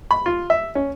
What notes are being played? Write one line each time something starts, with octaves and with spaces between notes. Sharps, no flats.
B5
F4
E5
C#4